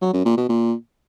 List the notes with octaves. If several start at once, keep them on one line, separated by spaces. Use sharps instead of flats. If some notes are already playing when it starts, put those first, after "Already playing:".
F#3
F#2
A#2
B2
A#2